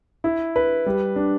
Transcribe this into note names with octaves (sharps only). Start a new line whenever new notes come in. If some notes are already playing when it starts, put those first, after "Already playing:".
E4
B4
G3
D4